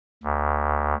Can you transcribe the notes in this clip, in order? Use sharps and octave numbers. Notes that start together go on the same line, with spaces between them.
D2